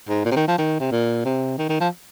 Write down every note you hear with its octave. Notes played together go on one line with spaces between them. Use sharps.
G#2
A#2
C3
D#3
F3
D#3
C3
A#2
C3
D#3
D#3
F3